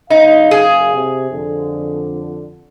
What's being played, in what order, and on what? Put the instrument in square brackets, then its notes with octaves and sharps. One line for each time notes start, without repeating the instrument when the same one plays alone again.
[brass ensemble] F#1 F5 [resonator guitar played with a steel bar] D#4
[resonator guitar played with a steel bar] G#4
[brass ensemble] C3
F2 D3